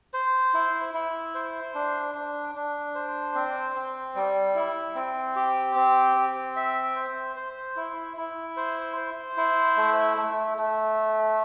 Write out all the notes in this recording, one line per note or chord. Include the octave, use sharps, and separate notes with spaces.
C5
E4
E4
C5
D4
D4
D4
C5
C4
C4
G3
E4
C4
G4
C4
C4
E5
C5
C5
E4
E4
C5
C5
E4
A3
A3
A3